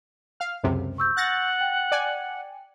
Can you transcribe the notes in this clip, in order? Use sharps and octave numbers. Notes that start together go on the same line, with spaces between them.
F5 F6
C#2 F#2 C3
C#6 E6 G6
F#5 F#6 A6 A#6
G5
D5 G#5